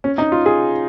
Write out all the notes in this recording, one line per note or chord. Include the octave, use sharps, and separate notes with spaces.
C#4
D#4
F4
G#4